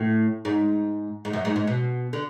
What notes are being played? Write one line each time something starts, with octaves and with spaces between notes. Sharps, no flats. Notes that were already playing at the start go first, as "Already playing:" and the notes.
Already playing: A2
G#2
G#2
F#2
G#2
G#2
B2
D3